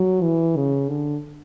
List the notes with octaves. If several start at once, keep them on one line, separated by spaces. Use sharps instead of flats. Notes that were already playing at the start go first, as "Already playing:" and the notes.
Already playing: F#3
E3
C#3
D3